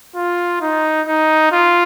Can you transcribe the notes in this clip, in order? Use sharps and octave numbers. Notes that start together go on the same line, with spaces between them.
F4
D#4
D#4
F4